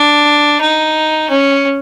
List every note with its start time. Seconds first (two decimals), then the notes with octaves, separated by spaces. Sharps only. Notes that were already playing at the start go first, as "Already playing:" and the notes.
Already playing: D4
0.61 D#4
1.30 C#4